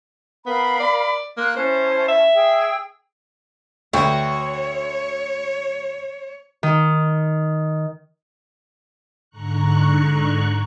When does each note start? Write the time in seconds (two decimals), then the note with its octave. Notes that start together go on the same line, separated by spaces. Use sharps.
0.46 B3 A#4 F5 B5
0.80 D5
1.37 A#3 C6 F#6
1.56 C#4 E4 C5 A5
2.08 E5
2.35 G#4 G5 E6
3.93 D2 F#4 B4 C#5 G5
6.63 D#3
9.30 G#2 D3 A#5 C#6 F#6